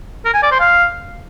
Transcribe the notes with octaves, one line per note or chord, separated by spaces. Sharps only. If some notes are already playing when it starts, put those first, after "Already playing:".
A#4
G#5
D5
C5
F5